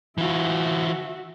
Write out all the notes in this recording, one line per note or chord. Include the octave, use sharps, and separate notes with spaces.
E3 F4 F#4 E5